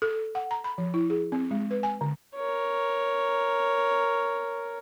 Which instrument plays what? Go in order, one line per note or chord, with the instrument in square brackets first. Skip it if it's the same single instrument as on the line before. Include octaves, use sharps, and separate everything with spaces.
[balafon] A4
F#5
A#5
B5
F3
E4
G#4
C4
G#3
B4
G#5
D3
[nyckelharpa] A#4 C#5